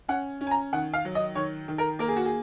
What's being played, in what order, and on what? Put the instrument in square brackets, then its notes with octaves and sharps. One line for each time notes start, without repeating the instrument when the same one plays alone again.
[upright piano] C#4 F#5
C#4
G#5
A#5
D#3 F#5
F5
F#3
D#5
D#3 C#5
D#3
A#4
A#3 A#4
G#4
F#4
G#4